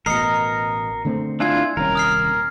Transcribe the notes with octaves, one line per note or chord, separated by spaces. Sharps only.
A1 B2 A#4 D#5 C7 C#7
D3 A3 C4
D4 E4 F4 G#5 G#6
D#1 C2 C#4 A#4
D#6 F6 C7